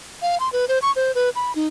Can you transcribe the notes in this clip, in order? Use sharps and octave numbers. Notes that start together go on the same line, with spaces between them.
F5
C6
B4
C5
C#6
C5
B4
B5
D#4